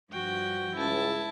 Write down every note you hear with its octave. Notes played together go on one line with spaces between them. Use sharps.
G2 F3 F#4 G5
C#2 E4 A5